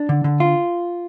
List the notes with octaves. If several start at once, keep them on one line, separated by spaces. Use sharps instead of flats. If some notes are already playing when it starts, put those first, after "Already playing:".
Already playing: D4
D3
D3
F4